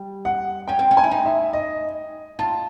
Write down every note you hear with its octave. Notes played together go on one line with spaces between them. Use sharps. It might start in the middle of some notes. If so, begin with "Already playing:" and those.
Already playing: G3
F#5
C#4 G5
C4
C#4
G#5
E4
D#4
E5
D#5
F4 A5